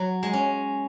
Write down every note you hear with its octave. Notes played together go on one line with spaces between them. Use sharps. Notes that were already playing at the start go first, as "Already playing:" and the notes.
Already playing: F#3
G#3
C#4